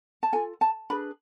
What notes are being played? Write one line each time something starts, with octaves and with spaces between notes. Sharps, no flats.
A5
F4 A4 G#5
A5
D4 G#4 B4 B5